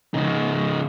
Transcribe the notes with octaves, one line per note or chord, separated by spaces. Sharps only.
C#3 D#4